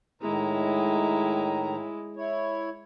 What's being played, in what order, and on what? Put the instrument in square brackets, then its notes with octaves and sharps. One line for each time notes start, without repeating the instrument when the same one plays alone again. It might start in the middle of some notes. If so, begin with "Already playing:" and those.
[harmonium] A2 D#3 A#5 [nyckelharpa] G#3 E4
[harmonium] E4 C#5